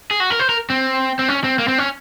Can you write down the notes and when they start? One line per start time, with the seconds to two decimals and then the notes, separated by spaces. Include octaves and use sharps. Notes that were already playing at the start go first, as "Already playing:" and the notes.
0.11 G#4
0.20 F#4
0.30 A#4
0.39 C5
0.49 A#4
0.70 C4
1.19 C4
1.28 C#4
1.44 C4
1.59 A#3
1.68 C4
1.78 C#4